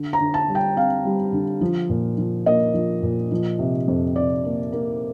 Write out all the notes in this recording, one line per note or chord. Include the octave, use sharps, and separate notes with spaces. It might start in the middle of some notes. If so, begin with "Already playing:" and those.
Already playing: D3
A#5
D3
A5
G3
G5
C4 F5
G3
D3
F3
A#2
F3
A#3 D#5
F3
A#2
F3
C3
F2
C3 D5
A#3
A#3